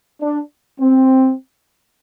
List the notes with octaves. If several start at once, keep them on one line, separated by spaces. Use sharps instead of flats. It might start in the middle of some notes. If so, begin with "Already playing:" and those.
D4
C4